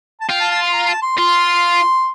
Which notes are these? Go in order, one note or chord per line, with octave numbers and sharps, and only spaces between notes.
A5
F4 G5
A5
A5
C6
A#5
A5
C6
F4 C6